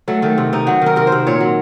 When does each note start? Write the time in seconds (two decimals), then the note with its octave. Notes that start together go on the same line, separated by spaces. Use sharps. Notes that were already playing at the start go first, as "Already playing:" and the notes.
0.08 F#3 A3
0.22 D#3 A3
0.38 C3
0.53 C3 D#4
0.67 F#3 F#4
0.82 D#3 A#4
0.96 C3 A#4
1.07 C5
1.12 C3
1.26 A#2 C#5
1.40 F#3